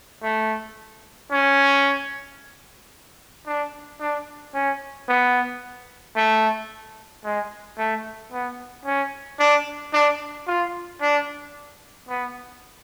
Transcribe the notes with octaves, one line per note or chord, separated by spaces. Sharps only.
A3
C#4
D4
D4
C#4
B3
A3
G#3
A3
B3
C#4
D4
D4
F4
D4
B3